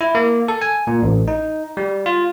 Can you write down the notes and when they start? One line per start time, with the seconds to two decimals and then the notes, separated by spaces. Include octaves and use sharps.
0.01 E4
0.15 A#3
0.48 A4
0.62 G#5
0.87 A#2
1.03 A1
1.28 D#4
1.77 G3
2.06 F4